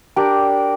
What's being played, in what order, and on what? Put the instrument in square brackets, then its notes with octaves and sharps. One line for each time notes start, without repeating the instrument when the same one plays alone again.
[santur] D4 G4 A#4 D5